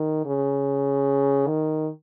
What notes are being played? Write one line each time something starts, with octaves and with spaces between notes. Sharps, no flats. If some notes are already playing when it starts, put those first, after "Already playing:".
Already playing: D#3
C#3
D#3